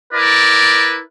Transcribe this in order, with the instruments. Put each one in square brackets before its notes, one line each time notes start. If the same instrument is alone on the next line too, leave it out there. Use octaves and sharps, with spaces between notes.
[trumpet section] E4 A#4 B4 D5